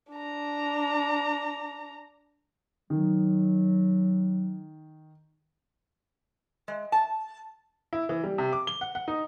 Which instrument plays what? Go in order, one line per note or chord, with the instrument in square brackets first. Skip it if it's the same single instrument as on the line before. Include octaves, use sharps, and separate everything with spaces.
[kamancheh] D4 A#5
[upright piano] D#3 [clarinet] F#3
[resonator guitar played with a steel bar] G#3
A5
[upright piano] E4
E3
G3
C3
D6
G7
F#5
F#5
D#4